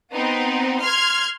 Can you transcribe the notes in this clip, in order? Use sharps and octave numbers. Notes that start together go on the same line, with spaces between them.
B3 C4 D#4
C6 F6 G#6